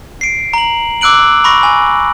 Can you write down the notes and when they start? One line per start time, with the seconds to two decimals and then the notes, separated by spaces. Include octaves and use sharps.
0.21 C7 D7
0.53 A#5 F#7
1.01 D6 E6 F#6 D7 F#7
1.44 B5 C#6 A#6
1.63 G#5